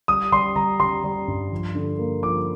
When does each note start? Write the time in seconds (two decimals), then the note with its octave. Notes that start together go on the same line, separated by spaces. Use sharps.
0.08 G3 D#6
0.32 G3 C6
0.56 G3 A#5
0.80 G3 C6
1.04 G3
1.28 G2
1.52 F3
1.75 D3
1.99 A#3
2.23 F3 D6